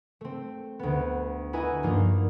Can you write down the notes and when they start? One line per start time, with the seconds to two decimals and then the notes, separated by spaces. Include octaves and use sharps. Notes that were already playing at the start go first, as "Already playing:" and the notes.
0.21 A3 C4
0.79 D2 B3
1.53 E4 F#4 B4 D#5 G#5 A#5
1.83 G2 F3 A#3 D4 D#4